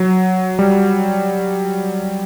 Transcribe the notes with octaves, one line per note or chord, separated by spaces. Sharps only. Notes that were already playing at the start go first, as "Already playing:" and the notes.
Already playing: F#3
G3